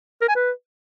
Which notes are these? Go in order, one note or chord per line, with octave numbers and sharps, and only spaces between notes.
A#4
G#5
B4